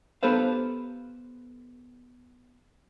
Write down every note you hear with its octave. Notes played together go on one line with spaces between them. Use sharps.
B3 G4 A4 B4 C5 F5